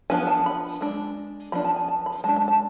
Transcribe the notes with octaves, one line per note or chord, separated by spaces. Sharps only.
F3 B3 D4 G#5
A5
B5
G#3 D4
F3 B3 D4 B5
A5
G#5
A5
B5
G#3 D4 A5
A5
A5